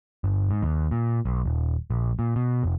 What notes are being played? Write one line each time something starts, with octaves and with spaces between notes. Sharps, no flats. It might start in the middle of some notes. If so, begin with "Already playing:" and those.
G1
G#2
D#2
A#2
B1
D#1
A#1
A#2
B2
F1